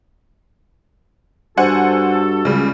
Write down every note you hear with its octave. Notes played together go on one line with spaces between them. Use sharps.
G2 F#4 A4 C5 F#5 G#5
C#2 C#3 G3